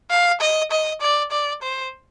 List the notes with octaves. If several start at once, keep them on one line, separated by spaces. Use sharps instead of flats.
F5
D#5
D#5
D5
D5
C5